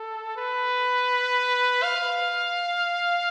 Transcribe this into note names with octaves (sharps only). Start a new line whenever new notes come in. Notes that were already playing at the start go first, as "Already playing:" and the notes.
Already playing: A4
B4
F5